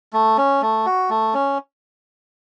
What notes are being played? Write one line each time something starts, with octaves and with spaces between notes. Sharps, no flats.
A3
C#4
A3
F#4
A3
C#4